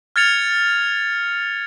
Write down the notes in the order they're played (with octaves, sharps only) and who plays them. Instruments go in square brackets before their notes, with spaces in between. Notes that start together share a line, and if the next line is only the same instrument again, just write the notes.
[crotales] F6 G#6 A6 C#7 F7